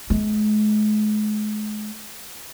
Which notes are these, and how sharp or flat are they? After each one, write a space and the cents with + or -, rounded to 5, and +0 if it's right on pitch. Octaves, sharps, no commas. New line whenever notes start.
G#3 +40